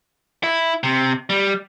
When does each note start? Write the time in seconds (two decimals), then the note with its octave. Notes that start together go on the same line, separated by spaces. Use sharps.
0.43 E4
0.83 C3
1.30 G3